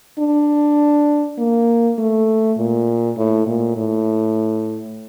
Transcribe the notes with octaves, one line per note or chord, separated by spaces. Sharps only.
D4
A#3
A3
A#2
A2
A#2
A2